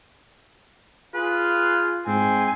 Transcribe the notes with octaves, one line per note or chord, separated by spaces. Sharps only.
F4 G#4 B4
G#2 C4 G#5